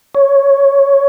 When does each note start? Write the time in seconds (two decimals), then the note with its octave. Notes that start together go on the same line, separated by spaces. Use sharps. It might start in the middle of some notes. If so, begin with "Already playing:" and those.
0.15 C#5